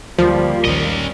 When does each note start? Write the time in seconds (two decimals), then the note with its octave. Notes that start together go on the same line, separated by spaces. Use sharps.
0.18 D2 F3 G3 A#3
0.65 A#1 D#2 D#3 C#4 D#5